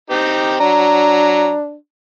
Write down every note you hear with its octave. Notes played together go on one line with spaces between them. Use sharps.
C4 D#4 G4
F#3 D4 A#5